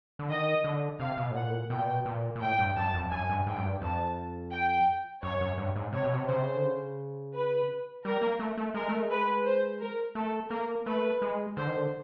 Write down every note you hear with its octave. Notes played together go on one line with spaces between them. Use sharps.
D3
D#3 D#5
D3
C3 F5
B2
A2
A#2 F#5
A2
A#2
B2 G5
A#2
B2
A#2
A#2
A2 G5
G2
F#2 A5
F2
F#2 G#5
G2
G#2 G5
F#2
G2
F2 A5
G5
F#2 C#5
F#2
G2
G#2
C3 C#5
B2
C3
C#3 C5
C3
C#3
D3
C#3
B4
G3 A#4
A#3
A3
A3
G#3 A#4
A3
G#3
B4
C5
A#4
A3 A4
A#3 A#4
A3 B4
G#3
D3 C5
D#3
D3